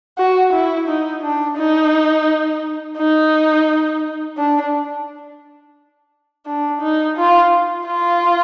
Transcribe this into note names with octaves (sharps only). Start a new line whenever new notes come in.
F#4
E4
D#4
D4
D#4
D#4
D4
D4
D#4
F4
F4